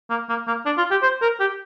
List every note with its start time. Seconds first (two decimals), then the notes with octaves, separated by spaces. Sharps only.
0.10 A#3
0.29 A#3
0.47 A#3
0.66 D4
0.78 F4
0.91 G4
1.02 C5
1.22 A#4
1.40 G4